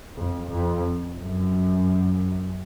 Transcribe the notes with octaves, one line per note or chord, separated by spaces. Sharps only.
F2
F2
F#2